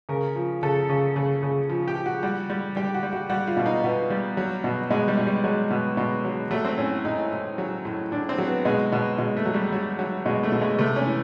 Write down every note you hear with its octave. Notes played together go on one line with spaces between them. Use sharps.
C#3 A#4
F3
C#3 A4
C#3
C#3
C#3
F3
G4
F3
F#4
G3 F#4
G3
G3 G4
F#4
G3
F#4
G3 F#4
F4
B2
D#4
B2 B3
G3
F#3
B2
B2 G#3
G3
B2
G3
F#3 G#3
B2
B2
F#3
F#3 A3
C4
A2 C#4
A2 D#4
A2
F#3
A2
A2 D4
C4
F#3
B3
B2 G#3
B2
B2 G#3
A3
F#3
G3
F#3
F#3
B2 G#3
A3
B2
G#3
C3 A3
C#4
E3